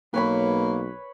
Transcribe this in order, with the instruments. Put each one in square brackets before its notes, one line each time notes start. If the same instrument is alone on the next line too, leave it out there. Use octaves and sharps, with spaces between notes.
[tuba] B1 [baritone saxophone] A#3 [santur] B4 C#5 B5